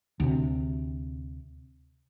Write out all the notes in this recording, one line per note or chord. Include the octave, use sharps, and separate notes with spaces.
D2 C3